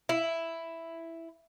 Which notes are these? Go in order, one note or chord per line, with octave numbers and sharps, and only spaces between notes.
E4